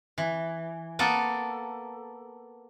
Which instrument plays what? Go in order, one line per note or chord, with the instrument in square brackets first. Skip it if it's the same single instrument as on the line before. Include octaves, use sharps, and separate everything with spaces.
[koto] E3
A#3 B3 A4